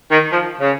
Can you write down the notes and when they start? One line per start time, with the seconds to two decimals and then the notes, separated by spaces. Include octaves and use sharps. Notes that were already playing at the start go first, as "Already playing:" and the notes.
0.11 D#3
0.32 F3
0.60 C#3